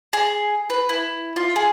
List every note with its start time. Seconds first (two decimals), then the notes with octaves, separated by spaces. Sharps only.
0.13 G#4
0.70 B4
0.89 E4
1.36 F4
1.56 G#4